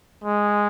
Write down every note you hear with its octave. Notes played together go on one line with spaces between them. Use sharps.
G#3